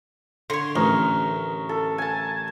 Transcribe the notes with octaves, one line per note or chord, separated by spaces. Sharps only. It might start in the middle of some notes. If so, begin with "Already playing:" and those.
D3 C#5 C6
A1 A#4 C#6 D#6
A4
G#5 A5